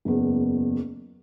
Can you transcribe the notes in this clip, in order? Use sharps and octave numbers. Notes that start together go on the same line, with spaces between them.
F#1 E2